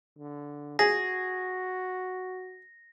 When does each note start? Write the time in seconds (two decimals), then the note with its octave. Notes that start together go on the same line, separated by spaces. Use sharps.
0.19 D3
0.79 F#4 G#4 A#6